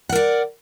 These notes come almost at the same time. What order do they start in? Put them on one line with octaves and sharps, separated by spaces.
F#5 A#4 D5